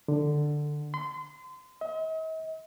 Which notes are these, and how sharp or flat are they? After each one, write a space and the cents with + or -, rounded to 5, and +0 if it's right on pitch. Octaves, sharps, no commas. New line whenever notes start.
D3 +10
C6 -30
D#5 +45